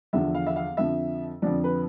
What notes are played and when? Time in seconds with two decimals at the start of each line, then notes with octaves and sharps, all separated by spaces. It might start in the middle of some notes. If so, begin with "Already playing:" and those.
0.13 E2 D3 F3 E5
0.35 F5
0.47 E5
0.56 F5
0.77 F2 D3 F3 E5
1.42 F2 D3 F3 D5
1.64 B4